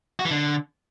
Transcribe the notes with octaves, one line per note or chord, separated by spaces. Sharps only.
F#4
E3
D3